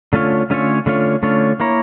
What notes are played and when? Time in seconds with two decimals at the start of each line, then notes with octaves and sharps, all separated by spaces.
0.13 D3 A3 C#4 F4 C#5
0.50 D3 A3 C#4 F4 C#5
0.86 D3 A3 C#4 F4 C#5
1.23 D3 A3 C#4 F4 C#5
1.60 A#3 E4 A#4 C#5